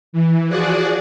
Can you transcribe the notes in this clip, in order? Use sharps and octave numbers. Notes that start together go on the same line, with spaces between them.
E3
F3 F#4 G#4 D5 F#5